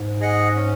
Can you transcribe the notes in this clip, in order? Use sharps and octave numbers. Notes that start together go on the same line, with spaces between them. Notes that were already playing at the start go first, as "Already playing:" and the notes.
Already playing: G#2
G#4 D#5 F#5
C#4